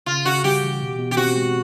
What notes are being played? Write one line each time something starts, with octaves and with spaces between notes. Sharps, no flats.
C#3 F4
C#3 F#4
G3 G4
E3
B2
B2
G4
C4 F#4
G#3